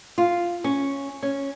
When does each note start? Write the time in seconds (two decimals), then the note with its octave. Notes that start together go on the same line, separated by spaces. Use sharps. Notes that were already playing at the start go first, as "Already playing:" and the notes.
0.18 F4
0.64 C#4
1.23 C#4